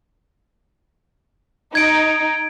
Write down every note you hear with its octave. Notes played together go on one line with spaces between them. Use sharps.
D#4 G#6 D7